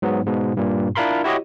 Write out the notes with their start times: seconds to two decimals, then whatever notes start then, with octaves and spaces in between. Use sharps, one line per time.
0.02 G#2 F#3 B3
0.27 G#2 B2
0.57 G2 A#2
0.95 D4 E4 F4 A#4 B5 C6
1.24 E4 F#4 G4 C#5 D#5